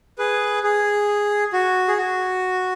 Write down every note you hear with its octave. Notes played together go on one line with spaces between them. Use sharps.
G#4 B4
G#4
F#4
G#4
F#4